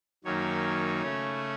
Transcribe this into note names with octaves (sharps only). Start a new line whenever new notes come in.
F#2 D#3 F#3 A#3 D#4 C#5
C#3 A3 C#4